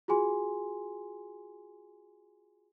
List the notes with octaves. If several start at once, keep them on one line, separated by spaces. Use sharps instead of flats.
F4 F#4 G#4 G#5 C6